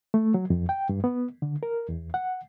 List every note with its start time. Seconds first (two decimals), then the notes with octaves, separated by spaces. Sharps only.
0.14 A3
0.34 F#3
0.50 F2
0.69 G5
0.89 G2
1.04 B3
1.42 D3
1.63 A#4
1.89 E2
2.14 F#5